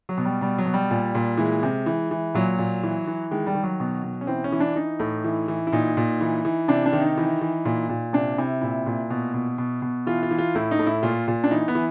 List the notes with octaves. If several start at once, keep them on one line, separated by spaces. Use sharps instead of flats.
F#3
B2
G3
B2 G3
F#3
B2
G3
A#2
A#2
E3 G#3
C3
E3
E3
A#2 F#3
A#2
E3
E3
D#3 G#3
G3
D#3
F#3
B2
B2
C#4
E3 C4
C#4
E3
D4
E3 D#4
A2
E3
E3
E4
A#2 D#4
A#2
E3
E3
C3 D4
D4
D#3
D#4
E3
E3
A#2
A#2
C3 D4
C3 E4
A#2 E4
A#2
B2
B2
B2
B2
E3 F4
F4
E3
F4
A2 E4
D#4
A2
E4
A#2 F4
A#2
D4
E3 D#4
B3
E3